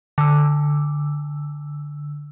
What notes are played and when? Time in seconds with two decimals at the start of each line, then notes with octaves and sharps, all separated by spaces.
0.18 D3 E6